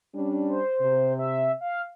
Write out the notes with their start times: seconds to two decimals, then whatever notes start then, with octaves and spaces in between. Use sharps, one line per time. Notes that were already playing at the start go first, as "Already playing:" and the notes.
0.15 G3 C#4 D4
0.49 C5
0.81 C3
1.19 E5
1.61 F5